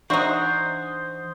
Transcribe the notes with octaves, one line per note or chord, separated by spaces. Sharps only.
E3 D4 D#4 F#4 C5 E5 D#6